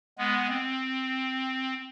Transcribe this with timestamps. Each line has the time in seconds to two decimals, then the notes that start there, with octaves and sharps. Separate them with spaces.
0.18 G#3 B3
0.49 C4